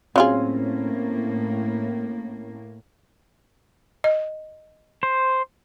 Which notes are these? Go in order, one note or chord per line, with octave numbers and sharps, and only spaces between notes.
A2 F#3 A#3 C4 C#4 F4 G#4
D#5
C5